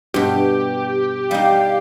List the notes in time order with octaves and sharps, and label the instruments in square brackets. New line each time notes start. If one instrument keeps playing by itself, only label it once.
[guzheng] G2 B2 [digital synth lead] G4
[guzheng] G3 D#4 [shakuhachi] F5